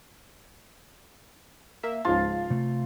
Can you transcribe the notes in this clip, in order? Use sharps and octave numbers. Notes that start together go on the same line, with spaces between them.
A#3 E5
C#2 G#2 F3 F4 F5 A5
C3 A3